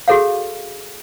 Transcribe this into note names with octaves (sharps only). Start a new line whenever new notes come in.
F#4 G#4 A4 C#5 F5